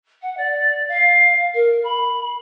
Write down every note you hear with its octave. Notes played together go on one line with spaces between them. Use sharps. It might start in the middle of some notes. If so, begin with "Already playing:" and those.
F#5
D5
F5
A#4
B5